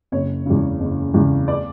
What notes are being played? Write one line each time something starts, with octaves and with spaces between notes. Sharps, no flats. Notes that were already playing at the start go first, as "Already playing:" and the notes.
F#1 C#5
E2 C#3
F#1
E2 C#3
D5